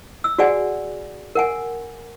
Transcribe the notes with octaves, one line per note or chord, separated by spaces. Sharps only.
E6
F#4 G#4 D5 F#5 G#5
A#4 F#5 G#5